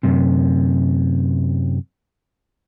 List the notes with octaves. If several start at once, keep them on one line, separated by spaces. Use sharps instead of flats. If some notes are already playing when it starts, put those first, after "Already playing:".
F#2 C3